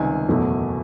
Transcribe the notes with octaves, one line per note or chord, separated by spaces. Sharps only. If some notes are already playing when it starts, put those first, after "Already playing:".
Already playing: C#2 C3 D#3 G3 G#5
F#1 E2 B2 F#3 A3